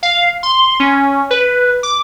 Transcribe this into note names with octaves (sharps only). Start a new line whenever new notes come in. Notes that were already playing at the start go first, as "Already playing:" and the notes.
F5
C6
C#4
B4
D6